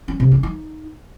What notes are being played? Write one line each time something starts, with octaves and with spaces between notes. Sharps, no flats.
C#4
C3
C#4
D#4